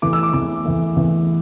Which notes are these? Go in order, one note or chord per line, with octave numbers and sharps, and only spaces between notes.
E2 E3 A3 D6
E6
D6
E2 E3 A3 D6
E2 E3 A3
E2 E3 A3